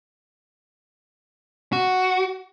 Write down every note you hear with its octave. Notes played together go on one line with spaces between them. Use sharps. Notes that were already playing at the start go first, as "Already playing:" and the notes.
F#4